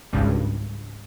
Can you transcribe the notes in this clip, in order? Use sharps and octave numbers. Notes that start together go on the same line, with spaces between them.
G#1 C#2 G2